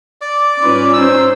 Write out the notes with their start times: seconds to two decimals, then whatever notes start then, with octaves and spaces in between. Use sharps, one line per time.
0.21 D5 D6
0.63 G#2 G3 C#4 F4 B4
0.93 D#4 C5 E6